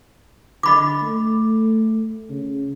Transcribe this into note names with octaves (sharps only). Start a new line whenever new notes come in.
D3 D#5 B5 D6
A3
C#3